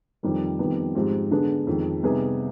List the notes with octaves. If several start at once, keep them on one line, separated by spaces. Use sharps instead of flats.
F2 D#3 G3 C4
F2 D#3 G3 B3
G#2 F3 G#3 C4 G4
D3 G#3 B3 D4 G#4
F2 D#3 G#3
C3 G3 B3 D#4 G#4